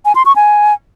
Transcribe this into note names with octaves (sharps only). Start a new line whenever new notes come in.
G#5
C6
C#6
G#5